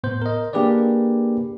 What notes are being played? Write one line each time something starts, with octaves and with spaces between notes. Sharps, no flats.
A2 B3 C5 G6
A#4 D#5
A#3 D4 G4 G#4 B4 D5